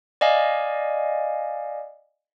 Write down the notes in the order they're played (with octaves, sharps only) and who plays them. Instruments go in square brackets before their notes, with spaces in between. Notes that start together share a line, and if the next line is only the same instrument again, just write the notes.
[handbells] D5 D#5 F5 G#5